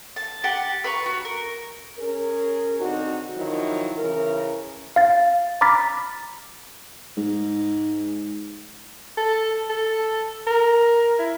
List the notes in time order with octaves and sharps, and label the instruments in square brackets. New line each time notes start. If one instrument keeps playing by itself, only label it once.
[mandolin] A5
G4 F#5 A5
B4 A#5 B5 C#6
F#4
A#4
[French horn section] C#4 G#4 A#4
D3 C4 D#4 F#4
D#3 F3 F#3 D#4 E4
C#3 E3 A#4
[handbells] F5 A6
A#5 B5 D6 F6 A6 B6
[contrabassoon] G#2
[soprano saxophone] A4
A4
A#4
E4